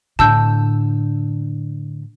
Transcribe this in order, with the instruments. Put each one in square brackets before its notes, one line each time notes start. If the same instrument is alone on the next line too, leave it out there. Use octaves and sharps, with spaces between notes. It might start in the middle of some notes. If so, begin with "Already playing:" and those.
[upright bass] A2 D3 [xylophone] A5 E6 G6